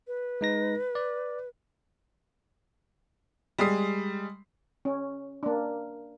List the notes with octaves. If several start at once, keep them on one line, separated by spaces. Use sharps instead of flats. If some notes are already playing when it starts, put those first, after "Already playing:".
B4
G#3 D#4 A#6
D5
G3 G#3 D#6 C7
C#4
A#3 D4